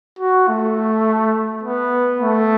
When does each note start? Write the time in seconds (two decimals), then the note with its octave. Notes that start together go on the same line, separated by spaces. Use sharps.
0.19 F#4
0.48 A3
1.63 B3
2.21 A3